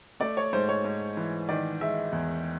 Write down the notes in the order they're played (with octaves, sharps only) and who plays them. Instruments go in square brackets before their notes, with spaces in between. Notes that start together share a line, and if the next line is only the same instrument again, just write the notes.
[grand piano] A3 [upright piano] D5
[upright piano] C#5
[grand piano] G#2 [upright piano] C5
[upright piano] C#5
[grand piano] G#2
E3
[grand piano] D#3 [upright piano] D5
[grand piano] G#3 [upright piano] E5
[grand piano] E2